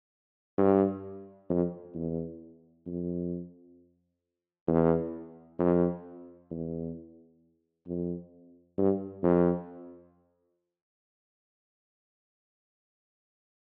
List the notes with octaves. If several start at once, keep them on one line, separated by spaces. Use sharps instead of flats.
G2
F2
E2
F2
E2
F2
E2
F2
G2
F2